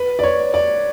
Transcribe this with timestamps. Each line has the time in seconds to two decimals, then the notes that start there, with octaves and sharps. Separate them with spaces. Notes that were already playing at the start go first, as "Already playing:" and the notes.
Already playing: B4
0.19 D5
0.24 C#5
0.54 D5